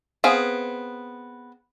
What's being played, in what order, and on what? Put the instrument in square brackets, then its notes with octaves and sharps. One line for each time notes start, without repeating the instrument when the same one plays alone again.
[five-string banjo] B3 C4 G#4 F5